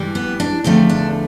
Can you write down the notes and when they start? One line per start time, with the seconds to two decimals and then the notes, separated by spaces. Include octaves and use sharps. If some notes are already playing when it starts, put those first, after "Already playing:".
Already playing: G2 E3 G3
0.15 B3
0.40 D4
0.64 E2 D3 F3 A3 C4
0.89 D4